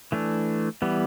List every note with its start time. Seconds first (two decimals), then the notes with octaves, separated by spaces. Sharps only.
0.12 E3 A3 D4
0.82 E3 G3 B3